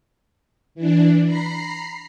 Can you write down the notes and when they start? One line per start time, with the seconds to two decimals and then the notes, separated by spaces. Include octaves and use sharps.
0.75 E3 D4
1.26 A#5 B5 C7